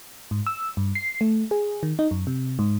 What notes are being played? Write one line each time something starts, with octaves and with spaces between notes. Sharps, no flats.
G#2
E6
G2
C7
A3
G#4
D#3
D#4
F#2
C3
G#2